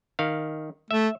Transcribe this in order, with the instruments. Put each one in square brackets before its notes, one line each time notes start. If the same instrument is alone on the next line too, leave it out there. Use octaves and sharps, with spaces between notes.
[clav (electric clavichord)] D#3 F5
[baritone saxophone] A3 [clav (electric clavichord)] E5